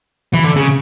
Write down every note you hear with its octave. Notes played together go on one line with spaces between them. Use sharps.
E3
D3
C#3